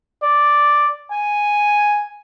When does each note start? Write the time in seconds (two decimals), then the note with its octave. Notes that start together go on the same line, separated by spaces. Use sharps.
0.23 D5
1.12 G#5